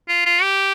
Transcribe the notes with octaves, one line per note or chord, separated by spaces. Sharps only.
F4
F4
G4